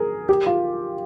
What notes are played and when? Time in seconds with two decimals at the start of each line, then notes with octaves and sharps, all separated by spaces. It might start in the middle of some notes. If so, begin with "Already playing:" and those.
Already playing: G#4 A#4
0.29 G4
0.46 F4